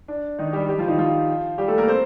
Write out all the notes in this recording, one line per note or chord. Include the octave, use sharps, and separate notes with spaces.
D4
D#3 D#4
G3 G4
G3 G4
F3 F4
D#3 D#4
F3 F4
G3 G4
A3 A4
A#3 A#4
C4 C5